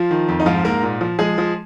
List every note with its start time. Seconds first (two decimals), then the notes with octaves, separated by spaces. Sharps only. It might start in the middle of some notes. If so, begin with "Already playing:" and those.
Already playing: F3 F4
0.11 D#3
0.28 F2
0.40 D#4
0.46 G#2 F3 F4
0.65 G#2 A#3 A#4
0.83 A#2
1.01 F3
1.19 F3 G#3 G#4
1.38 F3